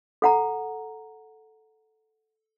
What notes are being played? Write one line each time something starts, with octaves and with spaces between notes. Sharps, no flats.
A4 F#5 A#5